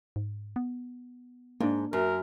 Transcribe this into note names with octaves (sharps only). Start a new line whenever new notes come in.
G#2
B3
G#2 A#3 D4
F#2 A#4